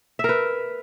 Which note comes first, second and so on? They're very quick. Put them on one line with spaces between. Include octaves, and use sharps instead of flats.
E5 A#4 B4